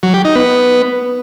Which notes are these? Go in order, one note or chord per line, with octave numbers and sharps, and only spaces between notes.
F#3
G4
D#4
B3